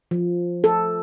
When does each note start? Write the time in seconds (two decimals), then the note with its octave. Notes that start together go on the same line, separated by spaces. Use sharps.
0.11 F3
0.64 A4